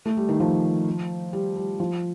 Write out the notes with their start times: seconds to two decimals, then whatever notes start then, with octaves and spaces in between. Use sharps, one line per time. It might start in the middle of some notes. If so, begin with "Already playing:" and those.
0.06 A3
0.17 G3
0.29 D#3
0.40 F3
1.33 G3
1.57 G3
1.80 F3